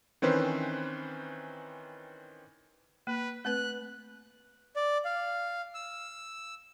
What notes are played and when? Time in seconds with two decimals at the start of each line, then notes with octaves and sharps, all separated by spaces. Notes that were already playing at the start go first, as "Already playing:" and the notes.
0.22 D#3 E3 C4 C#4 B4 C5
3.07 A#3 B4
3.45 A3 C4 B4 F#6
4.76 D5
5.05 F5
5.74 E6